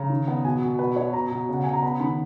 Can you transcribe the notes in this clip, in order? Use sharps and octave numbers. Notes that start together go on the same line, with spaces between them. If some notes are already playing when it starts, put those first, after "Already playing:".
Already playing: C#3 A#5
D#3
B3
B2 G#5
B2
B2 B4
B2 C#5
B2 A#5
B2
C#3 F#5
C#3 G#5
A#5
B3 B5
D#3 B5